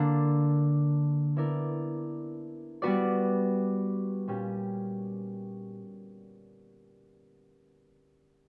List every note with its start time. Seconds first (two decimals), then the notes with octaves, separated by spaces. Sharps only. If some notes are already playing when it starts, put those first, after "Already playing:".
Already playing: D3 A#3 D4
1.36 B3 E4 A#4 D5
2.82 G3 B3 F#4 B4 D5
4.28 A#2 G3 C#4 G4